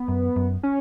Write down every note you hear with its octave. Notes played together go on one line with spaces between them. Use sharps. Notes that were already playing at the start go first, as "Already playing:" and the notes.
Already playing: B3
F#2
F#2
C#4